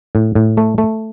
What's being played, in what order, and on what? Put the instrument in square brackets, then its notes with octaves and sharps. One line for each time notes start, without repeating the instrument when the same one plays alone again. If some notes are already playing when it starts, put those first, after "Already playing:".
[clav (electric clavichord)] A2
A2
A3
A3